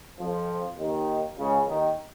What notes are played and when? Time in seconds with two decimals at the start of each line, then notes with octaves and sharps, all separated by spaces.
0.19 F2 F3
0.78 D#2 D#3
1.37 C#2 C#3
1.66 D#2 D#3